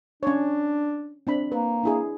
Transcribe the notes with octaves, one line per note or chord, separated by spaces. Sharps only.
C#4 D4 C#5
C4 D4 B5
A#3 B4
D4 E4 G#4